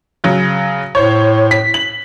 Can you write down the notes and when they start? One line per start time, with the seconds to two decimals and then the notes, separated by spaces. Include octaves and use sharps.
0.24 C#3 F#3
0.95 A2 C5 C#5
1.51 B6
1.74 F#7